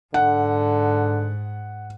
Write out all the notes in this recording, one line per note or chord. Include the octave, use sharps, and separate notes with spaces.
G#2 D3 F#5